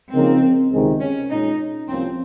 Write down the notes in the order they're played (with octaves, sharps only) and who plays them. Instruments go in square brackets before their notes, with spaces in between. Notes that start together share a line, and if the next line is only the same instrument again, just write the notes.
[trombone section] C#3 F3 A#3 D#4 A#4 [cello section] C4
[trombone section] C#2 C3 D#3 G#3 C4
[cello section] C#4
[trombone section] A#2 G#3 C#4 [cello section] D#4
[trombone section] C2 C3 F3 A#3 C#4 [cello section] C4